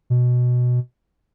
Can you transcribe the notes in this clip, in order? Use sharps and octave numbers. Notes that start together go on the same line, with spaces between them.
B2